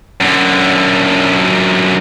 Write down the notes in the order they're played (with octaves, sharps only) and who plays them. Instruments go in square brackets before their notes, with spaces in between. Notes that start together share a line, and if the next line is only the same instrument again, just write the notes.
[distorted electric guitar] F#2 D3